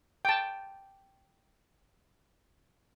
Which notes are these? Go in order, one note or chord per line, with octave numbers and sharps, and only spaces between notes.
G5 A5